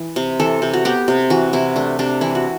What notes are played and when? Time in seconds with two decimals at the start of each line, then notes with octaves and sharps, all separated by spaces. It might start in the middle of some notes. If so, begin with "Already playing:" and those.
Already playing: E3
0.16 C3
0.40 E3 A4
0.62 C3
0.73 F#4
0.85 B3 G4
1.08 C3
1.30 E3 F#4
1.53 C3 E4
1.76 A3 D4
1.99 C3 D4
2.21 E3 E4
2.35 F#4